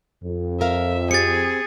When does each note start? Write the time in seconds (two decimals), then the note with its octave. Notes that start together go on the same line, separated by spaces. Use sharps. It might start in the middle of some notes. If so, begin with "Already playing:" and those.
0.23 F2
0.61 A#4 E5 F5
1.11 C4 G4 G#4 A6 C#7